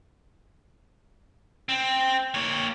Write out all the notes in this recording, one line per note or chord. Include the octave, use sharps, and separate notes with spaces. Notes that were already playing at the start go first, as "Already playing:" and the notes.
C4
A#3 C#5